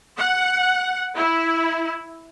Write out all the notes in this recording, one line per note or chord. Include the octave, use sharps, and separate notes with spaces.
F#5
E4